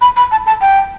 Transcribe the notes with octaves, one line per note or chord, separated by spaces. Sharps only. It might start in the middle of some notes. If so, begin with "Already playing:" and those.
B5
B5
A5
A5
G5